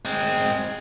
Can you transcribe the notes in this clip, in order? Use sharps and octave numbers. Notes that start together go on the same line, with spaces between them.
G#3 C4